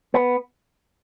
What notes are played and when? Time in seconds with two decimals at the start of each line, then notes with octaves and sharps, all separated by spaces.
0.14 B3